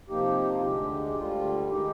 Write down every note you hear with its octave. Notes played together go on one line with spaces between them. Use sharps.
C3 F3 A#3 D#4 G4
F4
D2 D3 G#3 G4
G4
D2 D3 G3 F4
D#3 G#3 D#4 G4